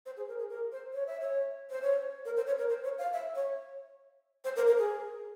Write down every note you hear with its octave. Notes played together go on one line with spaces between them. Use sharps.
C5
G#4
A#4
G#4
A#4
C5
C#5
E5
C#5
C5
C#5
A#4
C5
C#5
A#4
C5
C#5
F5
E5
C#5
C5
A#4
A#4
G#4